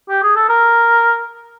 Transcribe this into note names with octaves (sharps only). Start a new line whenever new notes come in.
G4
G#4
A4
A#4